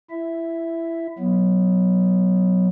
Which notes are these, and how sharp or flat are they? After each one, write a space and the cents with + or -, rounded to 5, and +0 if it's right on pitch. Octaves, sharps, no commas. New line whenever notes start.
E4 +20 E5 +0
F#3 +0 B3 -5